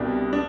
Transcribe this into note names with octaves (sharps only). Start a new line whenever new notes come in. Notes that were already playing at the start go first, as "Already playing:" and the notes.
Already playing: C2 B2 G3 D4
D4